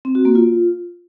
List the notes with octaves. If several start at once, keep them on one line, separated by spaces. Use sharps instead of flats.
C4
F#4
A#3
F4